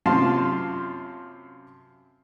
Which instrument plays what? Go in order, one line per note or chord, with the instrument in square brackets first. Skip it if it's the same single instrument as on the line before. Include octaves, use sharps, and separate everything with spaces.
[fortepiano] F#2 C3 F4 F5 A5 C6